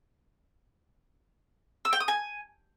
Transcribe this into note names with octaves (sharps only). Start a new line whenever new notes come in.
E6
G5
D#6
G#5